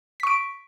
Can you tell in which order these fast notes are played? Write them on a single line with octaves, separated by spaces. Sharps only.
B6 C#6 D7